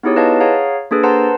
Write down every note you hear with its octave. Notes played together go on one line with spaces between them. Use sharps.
B3 D#4 E4 G4 G#4 C#5
E4 B4 C#5 D#5 F5 A5
G#4 C#5 F5 F#5 A#5
A#3 D4 G#4 A4 B4
B4 C5 F#5 A5 A#5 C6